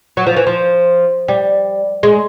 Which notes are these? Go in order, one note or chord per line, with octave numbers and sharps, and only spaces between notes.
F#3
F3
E3
F3
G3
G#3